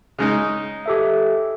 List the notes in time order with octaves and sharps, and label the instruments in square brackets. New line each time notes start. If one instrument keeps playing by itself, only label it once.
[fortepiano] C#3 G#3 D#4
[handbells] G4 A4 E5